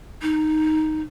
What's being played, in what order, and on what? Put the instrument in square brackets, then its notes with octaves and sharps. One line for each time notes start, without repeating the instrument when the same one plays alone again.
[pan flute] D#4